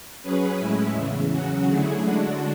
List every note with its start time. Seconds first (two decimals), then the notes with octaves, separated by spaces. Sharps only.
0.22 F#3 C#4 G#4 B4
0.58 A2 G#3 C#4 E4
0.94 E2 C#3 E3
1.31 C#3 F#3 C#4 F#4
1.67 D3 F#3 A3 E4 G#4
2.03 D3 G#3 D4 F#4